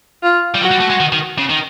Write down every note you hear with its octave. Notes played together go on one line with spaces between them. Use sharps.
F4
G3
F#3 F#4
G3
A3
G#3
D#3
D#3
C#3
D#3